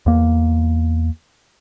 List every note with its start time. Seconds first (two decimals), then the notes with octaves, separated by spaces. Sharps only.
0.06 E2 A#3